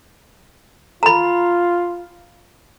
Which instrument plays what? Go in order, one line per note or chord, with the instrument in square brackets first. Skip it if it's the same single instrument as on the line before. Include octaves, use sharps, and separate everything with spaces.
[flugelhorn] F4 [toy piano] A#5 B5